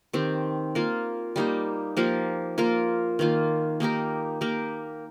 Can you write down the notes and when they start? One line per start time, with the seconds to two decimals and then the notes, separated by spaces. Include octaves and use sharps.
0.13 D#3 C4 G4
0.75 A#3 F4 A#4
1.36 G3 A#3 D#4 G4
1.97 F3 A#3 G4 A#4
2.58 A#3 F4 A#4
3.19 D#3 A#3 F4
3.80 A#3 D#4 G4 A#4
4.41 A#3 G4 A#4